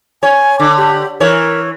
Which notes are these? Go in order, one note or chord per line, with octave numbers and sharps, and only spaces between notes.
C#5 G#5
D3 D6
G4
E3 A#4 C#5